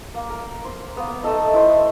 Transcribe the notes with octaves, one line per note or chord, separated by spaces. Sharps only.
A#3
A#4
C5
A#3 B3
A3 D#4 A4 D#5
E4 B4 C5